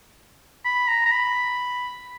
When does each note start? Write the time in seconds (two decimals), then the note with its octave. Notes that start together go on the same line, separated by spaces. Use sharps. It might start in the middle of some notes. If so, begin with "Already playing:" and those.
0.65 B5
0.88 A#5
1.05 A#5
1.12 B5